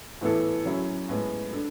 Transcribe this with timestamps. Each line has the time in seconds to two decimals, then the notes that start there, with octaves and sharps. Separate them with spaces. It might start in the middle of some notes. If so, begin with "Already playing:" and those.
0.21 A2 E3 B3 E4 A4
0.65 C#3 F#3 C#4 E4
1.09 A2 G#3 B3
1.53 D4 A4